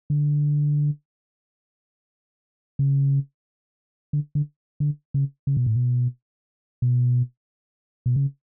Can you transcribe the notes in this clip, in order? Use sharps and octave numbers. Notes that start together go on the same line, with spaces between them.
D3
C#3
D3
D3
D3
C#3
C#3
B2
A2
B2
B2
B2
C#3